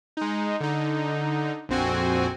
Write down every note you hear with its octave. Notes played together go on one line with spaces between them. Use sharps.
G#3 D#4
D3 D#4
A#1 F2 C4 F#4 G#5